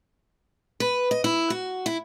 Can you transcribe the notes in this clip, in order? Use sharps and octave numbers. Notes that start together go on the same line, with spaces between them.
B4
D#5
E4
F#4
E4